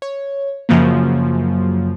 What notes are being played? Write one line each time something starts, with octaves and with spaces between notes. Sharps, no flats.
C#5
F#2 C#3 F3 F#3 A#3